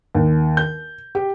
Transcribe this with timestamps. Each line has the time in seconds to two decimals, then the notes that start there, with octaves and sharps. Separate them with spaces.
0.15 D#2
0.57 G6
1.15 G4